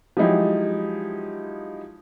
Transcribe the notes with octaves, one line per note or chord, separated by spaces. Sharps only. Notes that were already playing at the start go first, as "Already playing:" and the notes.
F3 F#3 G#3 D#4 E4 G4